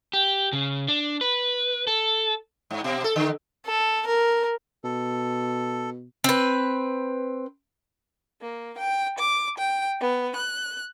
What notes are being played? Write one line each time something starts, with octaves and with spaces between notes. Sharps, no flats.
G4
C#3
D4
B4
A4
G#2
B2
A4
D3
A4
A#4
B2 A4
C4 B4
A#3
G5
D6
G5
B3
F#6